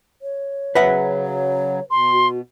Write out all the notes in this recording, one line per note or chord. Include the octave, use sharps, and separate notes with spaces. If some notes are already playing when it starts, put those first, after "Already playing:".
C#5
C#3 F#3 B4 E5 F#5
C#5
B2 C6
F#4